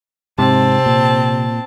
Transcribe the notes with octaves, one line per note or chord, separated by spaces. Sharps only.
G#2 C3 C4 A5
A#2